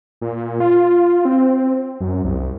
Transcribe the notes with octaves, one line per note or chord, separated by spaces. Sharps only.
A#2
F4
C4
F#2
C2